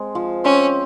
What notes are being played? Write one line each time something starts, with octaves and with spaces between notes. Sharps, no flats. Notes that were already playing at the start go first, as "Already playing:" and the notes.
Already playing: G#3 C4
F3
C4 C#4